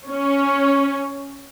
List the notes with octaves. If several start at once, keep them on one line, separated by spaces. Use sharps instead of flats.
C#4